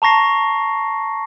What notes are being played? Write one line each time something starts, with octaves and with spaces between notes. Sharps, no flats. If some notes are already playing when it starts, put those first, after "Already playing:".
A5 A#5 C#6 A#6 C7